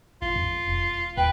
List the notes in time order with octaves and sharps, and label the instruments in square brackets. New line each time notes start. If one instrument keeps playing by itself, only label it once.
[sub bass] A1 [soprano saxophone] F4
[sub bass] F2
E1
[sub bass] D#2 [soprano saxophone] B4 [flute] G5